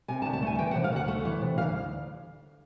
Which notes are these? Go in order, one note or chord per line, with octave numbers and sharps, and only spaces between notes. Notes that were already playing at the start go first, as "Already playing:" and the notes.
C3 G#5
A5
D2
A5
A3 G#5
E3 G5
F#5
C3
F5
D2 F#5
A3
E3
C3
D2 F5